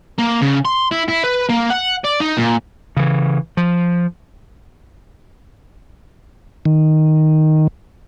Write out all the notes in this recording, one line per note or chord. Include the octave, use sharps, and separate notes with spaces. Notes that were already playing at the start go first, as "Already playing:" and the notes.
A#3
C#3
C6
E4
E4
B4
A#3
F#5
D5
D#4
A#2
C#3 E3
F3
D#3